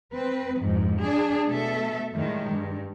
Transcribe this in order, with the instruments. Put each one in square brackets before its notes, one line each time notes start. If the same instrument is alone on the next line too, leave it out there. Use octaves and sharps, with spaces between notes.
[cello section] C4 B4
F2 G#2
D4 G#4
B2 A3 A4 E5
A2 D#3 G3 G#3
G2